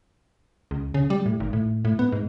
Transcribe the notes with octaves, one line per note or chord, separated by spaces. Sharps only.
C#2
C#3
G3
A2
G#1
A2
A2
B3
G#2